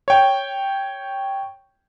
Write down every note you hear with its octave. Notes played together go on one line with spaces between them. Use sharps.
C#5 G5